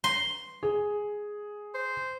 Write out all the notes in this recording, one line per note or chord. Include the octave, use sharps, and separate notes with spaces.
C6
G#4
C5